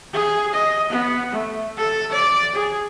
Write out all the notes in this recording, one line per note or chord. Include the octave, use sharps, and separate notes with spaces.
G#4
D#5
B3
A3
A4
D5
G#4